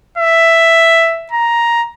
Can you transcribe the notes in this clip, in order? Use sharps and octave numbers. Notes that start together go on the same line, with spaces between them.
E5
A#5